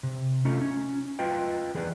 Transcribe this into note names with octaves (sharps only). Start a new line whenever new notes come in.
C3
A3 C#4 D#4 F4
C#4
F4 B4 D#5 G5
E3 G#4 B4 D5